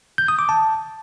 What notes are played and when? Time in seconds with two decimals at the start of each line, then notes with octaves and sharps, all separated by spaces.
0.18 G6
0.28 D#6
0.39 D6
0.49 A5